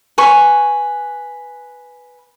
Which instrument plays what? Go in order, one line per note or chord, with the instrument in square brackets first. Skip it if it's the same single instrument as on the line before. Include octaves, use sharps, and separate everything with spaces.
[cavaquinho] B4 G#5 C#6